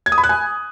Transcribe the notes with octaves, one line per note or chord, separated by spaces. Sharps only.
G#6
D#6
B5
F#6
G#5